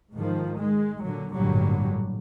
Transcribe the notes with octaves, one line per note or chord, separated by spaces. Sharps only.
G#2 D#3 F3
G#3
A#2 D3 F#3
A1 G2 A#2 D3 F#3 G3